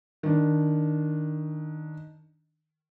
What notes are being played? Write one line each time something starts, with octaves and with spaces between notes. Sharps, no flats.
D#3 D4